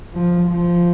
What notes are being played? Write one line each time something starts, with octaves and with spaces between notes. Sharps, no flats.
F3
F3